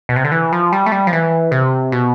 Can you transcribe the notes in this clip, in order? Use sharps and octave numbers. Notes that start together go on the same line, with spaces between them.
B2
C3
D3
E3
F3
G3
A3
G3
F3
E3
C3
B2